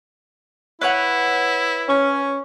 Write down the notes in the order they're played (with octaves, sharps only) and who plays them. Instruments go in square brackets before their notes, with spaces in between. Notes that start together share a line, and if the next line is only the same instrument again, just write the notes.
[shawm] E4 [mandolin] B4 C#5 F#5
[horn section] C#4